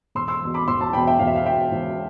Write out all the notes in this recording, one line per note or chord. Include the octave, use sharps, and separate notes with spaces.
E1 C6 E6
C6 E6
E2 B2
B5 D6
E1 C6 E6
A5 C6
E2 B2 G5 B5
E5 G5
E1 F5
E5
F5
E2 B2 E5 G5
E1